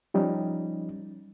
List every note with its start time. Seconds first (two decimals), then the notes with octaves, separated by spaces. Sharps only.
0.14 F3 G3 C#4 D#4